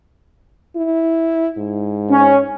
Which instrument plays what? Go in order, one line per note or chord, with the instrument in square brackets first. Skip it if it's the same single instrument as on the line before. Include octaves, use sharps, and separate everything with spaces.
[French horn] E4
G#2
[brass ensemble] C#4